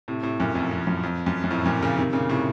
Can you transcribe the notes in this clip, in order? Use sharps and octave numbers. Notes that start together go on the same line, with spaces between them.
A2 C3
A2 C3
F#2 A#2
F2 A2
F2
F#2
F2
F#2
F#2
F2 A2
F#2 A#2
A#2 C#3
C3 D#3
A#2 C#3
A2 C3